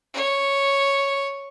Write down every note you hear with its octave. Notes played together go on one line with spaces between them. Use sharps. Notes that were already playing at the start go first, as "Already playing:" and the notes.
C#5